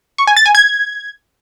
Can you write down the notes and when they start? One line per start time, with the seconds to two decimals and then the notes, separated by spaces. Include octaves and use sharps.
0.18 C#6
0.27 G#5
0.37 A6
0.46 G#5
0.55 G#6